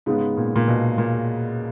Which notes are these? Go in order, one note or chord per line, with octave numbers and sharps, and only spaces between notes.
G#2 C#3 G#3 B3
A#2
A#2
B2
A#2